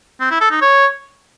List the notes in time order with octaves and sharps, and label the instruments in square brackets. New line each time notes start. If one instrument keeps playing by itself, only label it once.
[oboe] C4
E4
A4
D#4
C#5